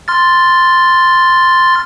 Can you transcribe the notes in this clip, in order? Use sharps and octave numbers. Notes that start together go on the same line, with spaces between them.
C6 F6 A6